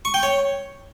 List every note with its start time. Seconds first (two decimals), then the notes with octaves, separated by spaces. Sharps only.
0.05 C#6
0.14 G5
0.23 C#5